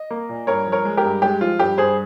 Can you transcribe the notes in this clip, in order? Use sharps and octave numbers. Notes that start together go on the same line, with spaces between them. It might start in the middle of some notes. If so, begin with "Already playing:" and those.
Already playing: D#5
A#3
A#2
G2 A#4 C#5
F3
A#4 C#5
G#3
G4 A#4
G2
G#3 G4
F3 F4
G2 G4
G2 G#4 C5